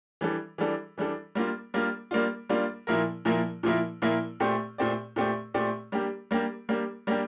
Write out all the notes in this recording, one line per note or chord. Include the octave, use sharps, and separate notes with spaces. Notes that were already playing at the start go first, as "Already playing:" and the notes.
E3 G3 D4 A4
E3 G3 D4 A4
E3 G3 D4 A4
G3 A#3 D4 F4
G3 A#3 D4 F4
G3 A#3 D4 F4
G3 A#3 D4 F4
A#2 F3 A#3 E4 A#4
A#2 F3 A#3 E4 A#4
A#2 F3 A#3 E4 A#4
A#2 F3 A#3 E4 A#4
A#2 A3 C4 G4 D5
A#2 A3 C4 G4 D5
A#2 A3 C4 G4 D5
A#2 A3 C4 G4 D5
G3 A#3 D4 G4
G3 A#3 D4 G4
G3 A#3 D4 G4
G3 A#3 D4 G4